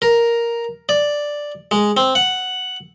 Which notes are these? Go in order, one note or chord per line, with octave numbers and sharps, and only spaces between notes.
A#4
D5
G#3
C4
F#5